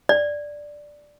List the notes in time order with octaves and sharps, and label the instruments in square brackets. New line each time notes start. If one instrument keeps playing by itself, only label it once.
[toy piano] D5